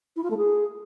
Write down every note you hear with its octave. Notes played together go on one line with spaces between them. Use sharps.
E4
F4
A3
G#4